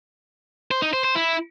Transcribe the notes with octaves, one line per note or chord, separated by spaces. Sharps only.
C5
D#4
C5
C5
E4